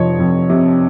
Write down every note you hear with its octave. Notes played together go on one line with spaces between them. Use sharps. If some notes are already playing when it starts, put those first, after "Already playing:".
Already playing: F1 F3 C#5 D#5
F2
C3